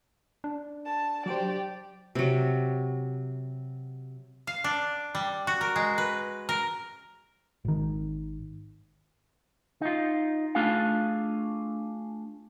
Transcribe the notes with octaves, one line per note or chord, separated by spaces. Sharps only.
D4
A5
F#3 G4 C5 D5
C3 F#3
F5
D4
G3
F#4
A#4
G#3
B4
A#4
G#1 D#3
D#4 F4
A3 D4 F4 G#4 F5